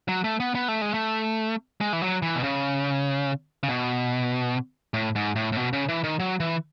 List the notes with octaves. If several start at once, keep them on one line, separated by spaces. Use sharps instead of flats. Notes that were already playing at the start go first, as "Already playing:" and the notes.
F#3
A3
B3
B3
A3
G#3
A3
G#3
E3
F#3
E3
B2
C#3
C#3
B2
A2
G#2
A2
A2
B2
C#3
E3
D#3
F#3
E3